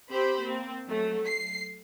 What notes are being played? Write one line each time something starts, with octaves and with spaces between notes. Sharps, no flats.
C4 G4 C5 B5
A#3 C4
F#3 A3
C7